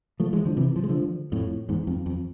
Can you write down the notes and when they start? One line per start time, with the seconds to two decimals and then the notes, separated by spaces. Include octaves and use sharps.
0.20 F3 A3
0.33 E3 G#3
0.45 D3 F3
0.57 C3 E3
0.76 F3
0.84 G#3
0.89 D3 F3
1.32 F2 A2
1.69 E2 G#2
1.87 F2
2.06 F2